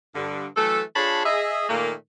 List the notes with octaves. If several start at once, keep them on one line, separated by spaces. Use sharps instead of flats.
G2 D3
E3 F#3 A3 A4
D4 F4 G#4 C#5 A5 B5
G#4 D#5 E5
A#2 D#3 A3 A#3